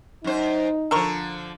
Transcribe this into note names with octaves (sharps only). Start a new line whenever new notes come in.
F#2 D#4 C5
D3 F3 A4 A#4 C#6